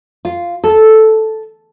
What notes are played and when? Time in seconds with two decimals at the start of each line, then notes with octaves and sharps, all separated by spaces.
0.25 F4
0.64 A4